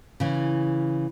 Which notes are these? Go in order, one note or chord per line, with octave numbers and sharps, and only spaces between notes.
C#3 E3